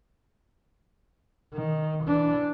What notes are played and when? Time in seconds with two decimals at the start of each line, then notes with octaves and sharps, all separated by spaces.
1.54 D#3
2.05 E3 D4